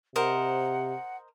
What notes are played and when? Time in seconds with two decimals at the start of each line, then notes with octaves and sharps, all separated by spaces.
0.16 C3 A#4 C5 D#5 F#5